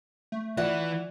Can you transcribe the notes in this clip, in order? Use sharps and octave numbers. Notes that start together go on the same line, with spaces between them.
A3
E3 F4 D5 E5 F#5